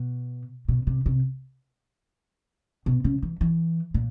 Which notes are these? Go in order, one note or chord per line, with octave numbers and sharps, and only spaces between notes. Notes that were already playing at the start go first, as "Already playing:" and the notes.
Already playing: B2
B2
C3
C3
B2
C#3
E3
E3
A#2